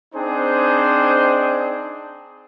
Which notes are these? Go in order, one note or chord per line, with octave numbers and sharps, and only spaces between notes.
C4 D4 D#4 G#4 C5